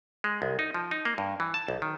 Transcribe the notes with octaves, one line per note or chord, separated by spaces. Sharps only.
G#3
C2
D#4
F3
D#4
A#3
G2
E3
A5
B1
D#3